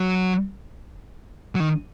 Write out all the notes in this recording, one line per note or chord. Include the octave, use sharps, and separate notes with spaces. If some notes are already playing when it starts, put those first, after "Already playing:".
Already playing: F#3
F#3
D#3